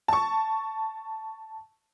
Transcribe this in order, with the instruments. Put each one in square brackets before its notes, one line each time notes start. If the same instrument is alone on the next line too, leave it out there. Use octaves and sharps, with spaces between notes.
[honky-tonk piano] A5 C#6